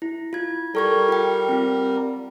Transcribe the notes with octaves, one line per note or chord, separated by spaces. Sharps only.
E4
F4 G#6
G3 A4 A#4 C#6 G#6
F4 G5
C4 F4